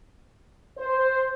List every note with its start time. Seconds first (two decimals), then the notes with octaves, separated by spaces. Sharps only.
0.78 C5